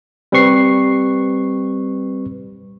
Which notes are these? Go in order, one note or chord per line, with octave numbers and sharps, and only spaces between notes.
G3 C4 B4 C#6 C7